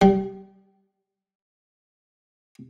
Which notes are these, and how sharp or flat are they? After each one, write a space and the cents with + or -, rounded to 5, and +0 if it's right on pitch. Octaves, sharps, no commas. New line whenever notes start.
G3 -20